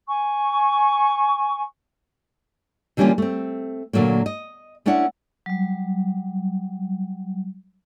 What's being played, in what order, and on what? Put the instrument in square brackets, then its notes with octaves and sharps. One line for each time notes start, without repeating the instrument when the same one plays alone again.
[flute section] G#5 C#6
[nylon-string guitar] D3 E3 G3 A#3 C#4 F4
A3 C4
A#2 D3 F#3 A3 A#3
D#5
A3 C#4 D4 E4 F#5
[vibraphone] F#3 G3